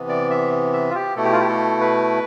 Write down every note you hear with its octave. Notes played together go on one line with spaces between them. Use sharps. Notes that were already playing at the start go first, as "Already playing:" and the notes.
Already playing: C3 E3 B3
D5
E5
E5
F4
G4
B2 A3 E4 A4
G4
F4
G4
A4
B4